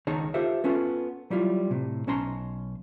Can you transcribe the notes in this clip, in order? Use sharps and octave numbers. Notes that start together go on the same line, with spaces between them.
C#2 D#3 D#4 C#5 A5 A#5
F4 G4 A4 C5 E5
B3 C#4 F4 A4
F#3 G3 E4 F4
A2 C3
B1 C#4 A5 A#5 C6